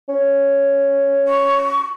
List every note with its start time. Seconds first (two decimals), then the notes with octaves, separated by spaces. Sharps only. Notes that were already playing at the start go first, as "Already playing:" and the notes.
0.09 C#4
1.28 C#6